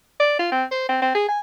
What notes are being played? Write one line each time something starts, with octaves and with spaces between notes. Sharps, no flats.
D5
F4
C4
C5
C4
C4
G#4
G#5